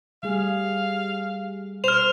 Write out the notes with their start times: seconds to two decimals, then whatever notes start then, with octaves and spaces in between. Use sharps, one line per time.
0.23 G3 A3 G#4 F5
1.84 B2 C5 F6 F7